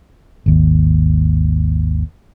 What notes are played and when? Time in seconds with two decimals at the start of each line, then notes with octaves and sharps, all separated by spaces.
0.46 G#1 D#2